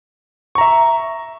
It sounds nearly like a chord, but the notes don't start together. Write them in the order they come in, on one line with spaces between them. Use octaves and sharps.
C#6 A#5 E5